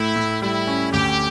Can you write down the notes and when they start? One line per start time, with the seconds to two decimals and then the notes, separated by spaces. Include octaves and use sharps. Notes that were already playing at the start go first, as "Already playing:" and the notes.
Already playing: A2 E4
0.16 A2
0.42 G3 E4
0.67 C#4
0.93 D2 G4